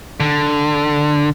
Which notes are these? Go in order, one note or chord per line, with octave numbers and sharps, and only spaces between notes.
D3